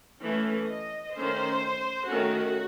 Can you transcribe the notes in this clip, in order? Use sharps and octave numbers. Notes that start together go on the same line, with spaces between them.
E3 A3 C#4
D#5
D#3 A3 C#4 C5
D#3 A3 C#4 F#4